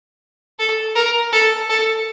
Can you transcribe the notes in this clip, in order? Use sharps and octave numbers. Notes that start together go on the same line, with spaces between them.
A4
A#4
A4
A4